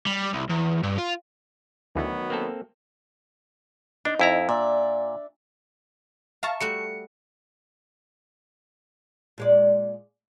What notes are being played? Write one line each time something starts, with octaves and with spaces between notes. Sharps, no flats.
G3
C2
E2
G2
F4
D2 D#3 E3 F#3 B3
A#3 C4 A4
D4 D#4
F2 E4 A#5
A#2 D4 D5 E5
E5 F5 A5 A#5 C#6
G3 A3 F#4 C#7
A#2 G#3 D5